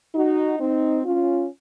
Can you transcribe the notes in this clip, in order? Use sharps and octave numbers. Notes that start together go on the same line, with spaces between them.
D#4 F#4
C4 D#4
C#4 F4